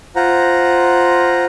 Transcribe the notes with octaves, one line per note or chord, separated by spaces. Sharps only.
F4 C5 F#5 A#5